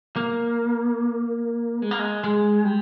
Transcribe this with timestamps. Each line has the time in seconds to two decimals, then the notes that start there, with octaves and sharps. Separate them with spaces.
0.16 A#3
1.82 G#3
1.91 A#3
1.99 G#3
2.24 G#3
2.65 G3